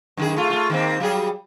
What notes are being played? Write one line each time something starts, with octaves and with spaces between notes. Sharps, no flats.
F#2 D#3 G#4
A3 F4
A3 F4
D#3 A#3 C4
F#3 G3 G#4